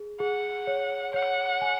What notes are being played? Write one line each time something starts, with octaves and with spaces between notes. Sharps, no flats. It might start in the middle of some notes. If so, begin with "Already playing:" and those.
Already playing: G#4
G#4 F#5
C#5
C#5 F#5
G#5